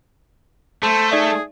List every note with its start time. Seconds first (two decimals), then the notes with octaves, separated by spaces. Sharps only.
0.83 A3 C5 A5
1.11 D#4 G#4 D5 E5